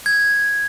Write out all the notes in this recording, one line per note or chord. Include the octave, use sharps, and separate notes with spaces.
G#6